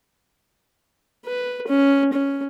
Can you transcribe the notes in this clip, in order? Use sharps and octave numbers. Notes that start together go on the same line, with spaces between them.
B4
C#4
C#4